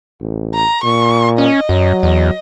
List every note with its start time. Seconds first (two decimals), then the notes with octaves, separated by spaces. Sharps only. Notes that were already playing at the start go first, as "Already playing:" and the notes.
0.21 A1
0.55 A#5
0.84 A#2 C#6
1.38 C#4 D#5
1.69 F#2 F#3
2.03 E2 D#5